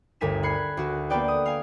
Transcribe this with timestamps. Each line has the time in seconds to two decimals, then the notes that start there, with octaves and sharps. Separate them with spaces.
0.21 G1 D2 A#4 G#5 B6 E7
0.43 B5 F#6 G#6 C7 C#7
0.77 D2 F#4
1.10 A#3 B3 A4 B4 D5 G5
1.28 D#6
1.46 F5 G#5